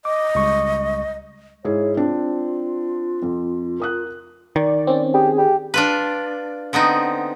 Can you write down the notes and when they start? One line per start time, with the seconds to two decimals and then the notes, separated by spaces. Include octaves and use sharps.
0.05 D#5 D6
0.35 C#2 G3 C#6
1.65 G#2 E4 G#4 C#5
1.97 C4 D4 F4
3.22 F2
3.80 A#4 D#6 F#6
4.56 D#3 D5
4.87 C4 C#4
5.14 G4 G#4
5.38 G4
5.74 D4 F4 B4
6.73 D3 B3 C4 D#4